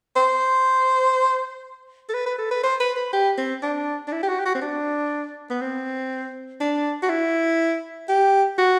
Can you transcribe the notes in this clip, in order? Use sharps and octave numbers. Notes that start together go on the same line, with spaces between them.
C5
A4
B4
B4
A4
B4
C5
B4
B4
G4
C4
D4
D4
E4
G4
F#4
G4
F#4
C4
D4
B3
C4
D4
F#4
E4
G4
F#4